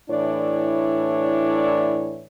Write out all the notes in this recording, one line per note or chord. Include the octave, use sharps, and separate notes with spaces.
A2 E3 D4 E4 C#5 D5